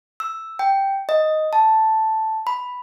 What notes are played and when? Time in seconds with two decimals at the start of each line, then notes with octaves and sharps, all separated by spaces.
0.20 E6
0.59 G5
1.09 D#5
1.53 A5
2.47 B5